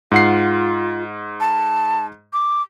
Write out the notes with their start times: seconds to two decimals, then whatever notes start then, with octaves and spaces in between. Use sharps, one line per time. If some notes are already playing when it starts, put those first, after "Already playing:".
0.12 G#2 F4 F#5 C7
1.40 A5
2.33 D6